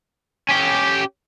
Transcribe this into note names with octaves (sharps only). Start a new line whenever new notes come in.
C#4 G4